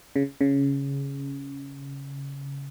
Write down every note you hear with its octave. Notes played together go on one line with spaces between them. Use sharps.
C#3
C#3